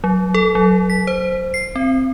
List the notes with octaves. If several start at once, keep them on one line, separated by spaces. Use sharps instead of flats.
F#3
A4
F#3
B6
C5
C7
C4